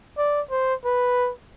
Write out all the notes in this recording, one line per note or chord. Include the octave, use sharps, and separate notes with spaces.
D5
C5
B4